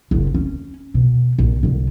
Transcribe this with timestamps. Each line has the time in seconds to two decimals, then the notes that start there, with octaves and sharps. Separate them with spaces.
0.11 F#1 E4
0.34 C#4
0.94 B2
1.38 A#1
1.63 C2 D3